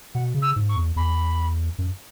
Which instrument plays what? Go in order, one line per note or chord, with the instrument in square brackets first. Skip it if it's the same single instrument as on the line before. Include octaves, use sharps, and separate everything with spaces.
[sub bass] B2 [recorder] F#5
[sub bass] C#3
[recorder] E6
[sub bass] G#2
[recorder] C#6
[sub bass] E2
[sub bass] E2 [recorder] B5
[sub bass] F#2